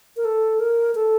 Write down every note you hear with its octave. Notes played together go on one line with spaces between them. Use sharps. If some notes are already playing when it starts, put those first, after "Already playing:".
A#4
A4
A#4
A4